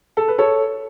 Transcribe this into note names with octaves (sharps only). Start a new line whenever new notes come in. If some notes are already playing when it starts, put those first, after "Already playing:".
A4
B4
A4 C#5